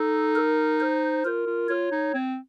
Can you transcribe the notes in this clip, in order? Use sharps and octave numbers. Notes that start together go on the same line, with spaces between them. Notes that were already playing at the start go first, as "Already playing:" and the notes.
Already playing: D#4 A4
A#4
C5
F4 A#4
F4
F4 C#5
D#4
C4